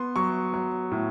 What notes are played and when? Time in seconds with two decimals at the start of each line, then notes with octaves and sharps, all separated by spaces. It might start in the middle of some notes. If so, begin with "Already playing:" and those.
Already playing: B3 C6
0.16 F#3 C#6
0.54 F#3
0.91 A2